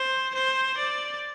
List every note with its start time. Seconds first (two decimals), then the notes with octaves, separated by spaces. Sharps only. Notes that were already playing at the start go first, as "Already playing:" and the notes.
Already playing: C5
0.34 C5
0.77 D5